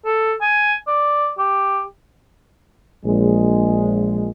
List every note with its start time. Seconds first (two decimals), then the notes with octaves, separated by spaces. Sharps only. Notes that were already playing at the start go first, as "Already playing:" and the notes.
0.05 A4
0.41 G#5
0.87 D5
1.38 G4
3.05 A#1 G#3